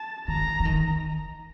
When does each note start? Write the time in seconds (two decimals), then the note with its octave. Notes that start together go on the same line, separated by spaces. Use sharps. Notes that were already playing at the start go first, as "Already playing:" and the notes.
Already playing: A5
0.28 D#3 A#5
0.60 E3
0.65 D#3